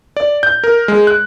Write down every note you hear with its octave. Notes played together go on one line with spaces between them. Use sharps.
D5
G6
A#4
G#3
F#6